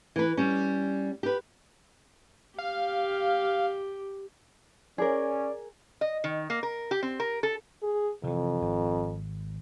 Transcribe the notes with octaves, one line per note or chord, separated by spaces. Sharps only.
E3 B4
G3 C#4
G4 B4
G4 F5
C#4 G#4 A#4 D5
D#5
D#3
A#3
A#4
G4
C4
A#4
A4
G#4
F2 C3 E3
G#1